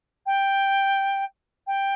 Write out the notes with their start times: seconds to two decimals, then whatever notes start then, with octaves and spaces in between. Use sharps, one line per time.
0.26 G5
1.67 G5